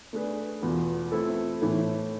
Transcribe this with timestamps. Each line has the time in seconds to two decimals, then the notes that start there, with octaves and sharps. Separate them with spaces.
0.13 A3 D4 G#4 B4
0.62 E2 B2 B3 F4
1.12 F3 A3 C4 E4 A4
1.61 A2 E3 A3